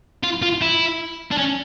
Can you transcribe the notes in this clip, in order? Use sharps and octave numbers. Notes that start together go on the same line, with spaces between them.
F4
F4
E4
D4
C#4